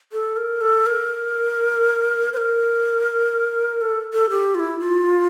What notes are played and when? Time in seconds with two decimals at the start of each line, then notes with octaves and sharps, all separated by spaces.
0.12 A4
0.37 A#4
0.61 A4
0.86 A#4
2.33 C5
2.37 A#4
3.81 A4
4.13 A4
4.30 G4
4.55 F4
4.59 E4
4.79 F4